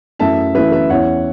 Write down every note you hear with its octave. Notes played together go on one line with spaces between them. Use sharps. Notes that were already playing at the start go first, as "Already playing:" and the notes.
F#2 E3 A3 E5 A5
F#2 E3 A3 B4 E5
B4 E5
E2 E3 C#4 E4 C#5 F#5